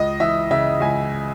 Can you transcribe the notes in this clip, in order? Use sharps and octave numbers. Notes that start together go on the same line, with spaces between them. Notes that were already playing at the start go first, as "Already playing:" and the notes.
Already playing: C#2 D#5
E3 E5
C#3 E5
C#2 G#5